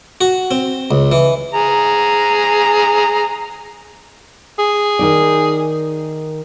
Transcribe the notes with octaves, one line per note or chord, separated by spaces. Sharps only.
F#4
C4
C#2
E3
G#4 A#5
G#4
D#3 D#4 D5